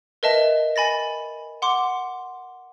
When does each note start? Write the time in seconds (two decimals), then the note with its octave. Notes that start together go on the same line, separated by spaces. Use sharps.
0.23 A#4 B4 D#5 E5 A5
0.76 G#5 B5 A6 A#6
1.62 F#5 C6 D6